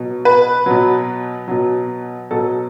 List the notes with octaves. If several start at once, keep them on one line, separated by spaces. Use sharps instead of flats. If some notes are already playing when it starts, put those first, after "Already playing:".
Already playing: B2 F#3
B4
B2 F#3
B2 F#3
B2 F#3 A4